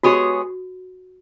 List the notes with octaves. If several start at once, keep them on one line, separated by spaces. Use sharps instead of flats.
G#3 B3 F#4 G#4 C#5